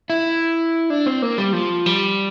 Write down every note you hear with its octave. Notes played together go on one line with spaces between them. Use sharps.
E4
D4
C4
A#3
G3
F3
G3